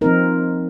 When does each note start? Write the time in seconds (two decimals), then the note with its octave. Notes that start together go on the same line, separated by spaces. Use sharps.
0.01 F3 C4 D#4 A#4